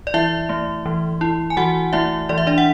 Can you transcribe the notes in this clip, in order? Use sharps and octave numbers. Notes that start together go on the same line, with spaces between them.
D5
E3 E4 E5
A3
E3
E4
G#5
E3 F#4 F#5
A3 E4 E5
E3 D5
E5
D4 D5
F#5